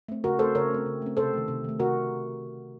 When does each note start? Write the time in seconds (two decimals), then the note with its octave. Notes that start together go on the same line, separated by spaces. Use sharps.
0.08 A3 C4
0.24 C#3 F#4 A#4
0.39 A3 C4 A4 C5
0.55 C#3 A#4 C#5
0.71 A3 C4
0.86 C#3
1.02 A3 C4
1.17 C3 A4 C5
1.33 D#3 A3
1.48 C3
1.64 D#3 A3
1.79 C3 F#4 A#4